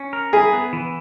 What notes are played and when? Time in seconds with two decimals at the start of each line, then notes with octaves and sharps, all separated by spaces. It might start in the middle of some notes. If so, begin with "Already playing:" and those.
Already playing: C#4
0.13 A#4
0.33 E4 G#4
0.53 B3
0.73 E3